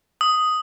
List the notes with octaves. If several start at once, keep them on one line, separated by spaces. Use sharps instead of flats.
D#6